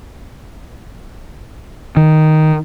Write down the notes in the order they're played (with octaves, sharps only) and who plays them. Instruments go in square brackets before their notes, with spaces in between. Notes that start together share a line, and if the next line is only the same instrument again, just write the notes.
[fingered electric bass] D#3